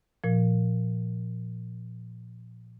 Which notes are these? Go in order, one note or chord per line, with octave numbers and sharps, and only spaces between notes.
A#2 F3